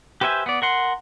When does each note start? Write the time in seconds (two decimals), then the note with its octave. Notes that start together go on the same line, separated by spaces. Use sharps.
0.21 G4 B4 C5 E5 G#5
0.46 B3 D5
0.62 A#4 F#5 C6